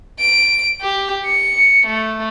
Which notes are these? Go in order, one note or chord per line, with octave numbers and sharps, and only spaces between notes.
D7
G4
C#7
A3